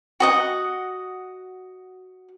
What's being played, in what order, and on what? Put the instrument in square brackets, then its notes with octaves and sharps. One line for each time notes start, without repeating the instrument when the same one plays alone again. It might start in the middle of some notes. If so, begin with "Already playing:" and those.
[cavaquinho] F#4 D#5 F#5